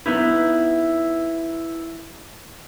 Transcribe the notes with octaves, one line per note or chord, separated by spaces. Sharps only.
B3 D#4 E4